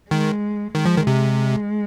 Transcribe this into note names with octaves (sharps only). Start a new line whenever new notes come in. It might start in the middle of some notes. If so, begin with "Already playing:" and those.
D#3 G#3
D#3 G#3
F3
D#3
C3